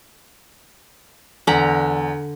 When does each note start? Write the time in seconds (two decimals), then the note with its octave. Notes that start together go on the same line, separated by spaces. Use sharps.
1.47 E2 D3 A#5 B5